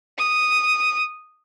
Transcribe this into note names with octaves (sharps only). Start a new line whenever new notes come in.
D#6